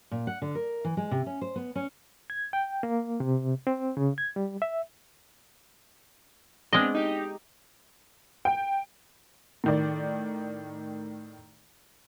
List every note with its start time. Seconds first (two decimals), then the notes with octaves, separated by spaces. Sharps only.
0.11 A#2
0.27 F#5
0.42 D3
0.55 A#4
0.84 E3
0.97 G#3
1.11 C3
1.26 C#4
1.41 C5
1.56 B3
1.75 C#4
2.30 G#6
2.53 G5
2.83 A#3
3.20 C3
3.67 C4
3.97 C#3
4.18 G#6
4.36 G3
4.62 E5
6.73 G#3 B3 C4 D4 D#5
6.95 D#4 G4
8.45 G5
9.64 A2 D#3 D5